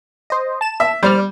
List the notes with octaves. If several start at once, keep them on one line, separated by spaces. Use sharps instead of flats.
C5 D#5
A5 E7
E5
G3 C5 D5 F6